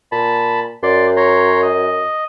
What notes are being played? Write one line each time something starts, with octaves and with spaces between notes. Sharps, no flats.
A#2 A5 B5
F#2 D5 C6
C#5 A#5 C6
D#5